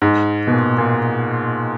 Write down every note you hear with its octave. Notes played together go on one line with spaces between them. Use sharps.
G#2
B2
A#2
A#2